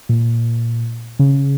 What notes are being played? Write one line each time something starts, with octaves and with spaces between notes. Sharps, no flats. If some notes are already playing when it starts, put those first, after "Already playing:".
A#2
C#3